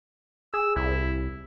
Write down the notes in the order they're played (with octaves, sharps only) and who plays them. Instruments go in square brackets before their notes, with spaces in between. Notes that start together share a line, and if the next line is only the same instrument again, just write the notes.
[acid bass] G#4 [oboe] E6
[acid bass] C2 [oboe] E4